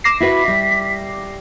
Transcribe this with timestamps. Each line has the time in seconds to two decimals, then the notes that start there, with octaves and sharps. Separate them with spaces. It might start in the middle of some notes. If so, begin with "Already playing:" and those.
0.04 D6 A#6 C7 E7
0.20 E4 F#4 B4 B6
0.48 G3